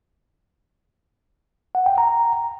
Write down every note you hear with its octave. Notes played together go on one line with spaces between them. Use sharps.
F#5
G5
A#5